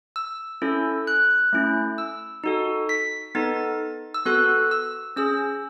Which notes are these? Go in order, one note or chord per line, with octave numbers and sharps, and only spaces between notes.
E6
C#4 E4 A4
F#6
A3 C#4 E4
E6
D#4 F#4 A4
B6
B3 D#4 A4 A6
E6
B3 F#4 A4 F#6
E6
C#4 G#4 E6